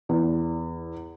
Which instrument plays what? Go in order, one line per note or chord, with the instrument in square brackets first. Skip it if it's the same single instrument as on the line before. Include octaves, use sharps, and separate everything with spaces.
[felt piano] E2